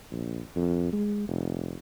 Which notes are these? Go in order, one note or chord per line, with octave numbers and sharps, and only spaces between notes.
A#1
F2
G#3
F1